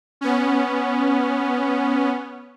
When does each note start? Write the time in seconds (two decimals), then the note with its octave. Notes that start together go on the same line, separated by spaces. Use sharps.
0.21 B3 C#4